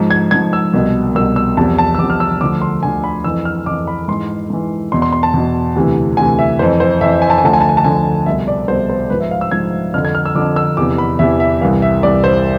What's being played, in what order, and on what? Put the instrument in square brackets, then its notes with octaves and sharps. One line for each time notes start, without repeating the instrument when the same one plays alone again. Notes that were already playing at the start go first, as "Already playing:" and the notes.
Already playing: [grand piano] G#2 F3
G#6
G#2 F3 G#6
E6
C2 B2
C2 B2 E6
E6
E2 C3 F3 A5
A5
E6
E2 C3 F3 D6
F6
E6
D2 D3 F3 D6
C6
D2 D3 F3 G#5
B5
F2 E3 E6
F6
F2 E3 D6
B5
G#2 E3 C6
G#2 E3
E2 B2 C6
C6
C6
A5
E2 B2
D2 C3 E3
D2 C3 E3 G#5
E5
E3 C5
F2
C5
F2 E3 E5
G#5
A5
G#5
D2 D3 F3 A5
G#5
A5
G#5
A5
D2 D3 F3 G#5
C2 B2 E5
D5
C2 C5
B2
C5
G#2 F3 B4
E5
F5
E6
G#2 F3 G#6
F2 D3 F3 F6
G#6
F6
E6
F2 D3 F3 D6
E6
E2 C3 E3 D6
B5
E2 C3 E3 E5
E5
C2 C3 E3 F5
E5
C2 C3 E3 D5
C5